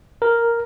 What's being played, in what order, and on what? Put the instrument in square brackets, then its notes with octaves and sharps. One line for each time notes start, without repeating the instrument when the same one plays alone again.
[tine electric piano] A#4